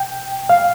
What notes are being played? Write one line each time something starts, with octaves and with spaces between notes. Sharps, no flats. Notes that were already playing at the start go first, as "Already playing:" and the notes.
Already playing: G5
F5